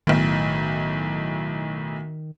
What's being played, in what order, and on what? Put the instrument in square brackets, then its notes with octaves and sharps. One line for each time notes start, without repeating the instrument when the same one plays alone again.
[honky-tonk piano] B1 A2 [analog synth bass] D#3